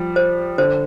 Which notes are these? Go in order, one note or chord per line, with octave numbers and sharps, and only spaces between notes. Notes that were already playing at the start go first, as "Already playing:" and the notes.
Already playing: F3 G3
C5
D3 C5